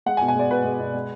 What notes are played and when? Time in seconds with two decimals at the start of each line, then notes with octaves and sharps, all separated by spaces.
0.06 G#3 F#5
0.17 G#5
0.21 B2
0.28 G#5
0.36 G#3 D5
0.51 B2 B4
0.64 G#3
0.80 B2
0.94 G#3